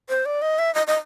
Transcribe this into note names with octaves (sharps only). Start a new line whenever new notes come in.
C5
D5
D#5
E5
D#5
D#5